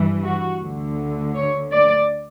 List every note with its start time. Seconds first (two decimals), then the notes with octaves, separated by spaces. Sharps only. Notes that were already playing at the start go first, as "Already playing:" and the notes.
Already playing: G2 E3
0.24 F#4
0.61 D2 D3
1.34 C#5
1.71 D5